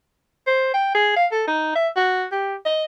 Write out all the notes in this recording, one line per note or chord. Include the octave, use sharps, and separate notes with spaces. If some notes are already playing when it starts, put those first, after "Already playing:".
C5
G5
G#4
F5
A4
D#4
E5
F#4
G4
D#5